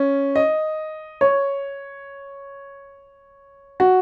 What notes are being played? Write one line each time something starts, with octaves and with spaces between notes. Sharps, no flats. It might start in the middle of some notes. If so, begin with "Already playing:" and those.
Already playing: C#4
D#5
C#5
F#4